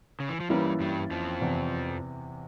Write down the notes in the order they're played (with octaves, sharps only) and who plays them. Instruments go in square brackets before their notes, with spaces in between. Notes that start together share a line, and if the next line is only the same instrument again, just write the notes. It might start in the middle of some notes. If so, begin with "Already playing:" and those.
[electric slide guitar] C#3
E3
F3
[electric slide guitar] G2 G3 [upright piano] E3 A#3 C#4 E4 A#4
[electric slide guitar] G2 G3
F2 F3
[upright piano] E2 C3 E3